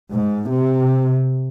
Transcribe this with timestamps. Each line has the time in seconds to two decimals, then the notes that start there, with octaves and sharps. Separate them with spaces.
0.13 G#2
0.49 C3